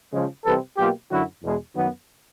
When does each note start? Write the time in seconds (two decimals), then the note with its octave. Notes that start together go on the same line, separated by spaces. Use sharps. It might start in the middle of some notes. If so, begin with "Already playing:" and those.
0.13 C#3 F3 G#3
0.45 C3 E3 G3 C4 A4 B4
0.78 B2 F#3 A#3 F4 G4
1.10 F#2 D3 F#3 E4 F#4
1.42 E2 B2 G#3
1.75 F#2 D#3 F#3 B3